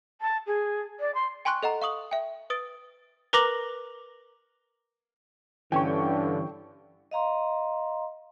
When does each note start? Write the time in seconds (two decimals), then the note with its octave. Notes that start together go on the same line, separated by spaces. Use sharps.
0.21 A5
0.47 G#4
1.00 D5
1.14 C6
1.45 G5 G#5 C6 C#6 F#6
1.63 A4 D#5 F#5 A#5
1.82 F5 C#6 D#6 F#7
2.11 E5 G5
2.50 B4 D#6 A6 D7
3.33 A#4 B4 A#5 D6 A#6 F#7
5.72 G2 D3 E3 C#4 G5 C#6
7.11 D#5 F5 A#5 C6